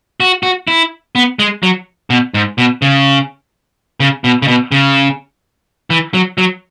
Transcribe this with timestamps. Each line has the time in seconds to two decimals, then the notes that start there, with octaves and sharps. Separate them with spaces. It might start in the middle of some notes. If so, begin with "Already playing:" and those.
0.20 F#4
0.43 F#4
0.68 E4
1.15 B3
1.39 G#3
1.63 F#3
2.10 B2
2.34 G#2
2.58 B2
2.82 C#3
4.00 C#3
4.24 B2
4.42 C#3
4.48 B2
4.72 C#3
5.90 E3
6.14 F#3
6.38 F#3